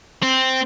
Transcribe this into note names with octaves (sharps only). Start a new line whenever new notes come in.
C4